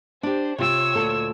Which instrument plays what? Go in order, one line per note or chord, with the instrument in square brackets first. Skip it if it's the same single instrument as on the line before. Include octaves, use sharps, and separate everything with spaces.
[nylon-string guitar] D4 G4 [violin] C5
[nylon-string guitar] C3 F4 G5 [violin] C#5 E6
[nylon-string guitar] D2 A#2 A4